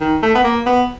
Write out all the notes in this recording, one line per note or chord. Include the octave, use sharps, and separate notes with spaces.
D#3
A3
B3
A#3
B3